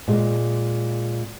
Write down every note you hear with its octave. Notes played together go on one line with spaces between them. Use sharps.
A#2 G#3